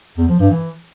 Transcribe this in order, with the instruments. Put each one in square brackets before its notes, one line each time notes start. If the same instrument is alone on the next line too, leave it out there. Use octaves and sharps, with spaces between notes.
[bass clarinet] E2
F3
G2
E3